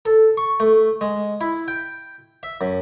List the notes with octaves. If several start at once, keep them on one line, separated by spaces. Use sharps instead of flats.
A4
C#6
A3
G#3
E4
G5
E5
F#2